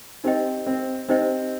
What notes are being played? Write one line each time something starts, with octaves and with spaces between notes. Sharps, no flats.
C4 D#4 G4 C5 D#5 G5
C4
C4 D#4 G4 C5 D#5 G5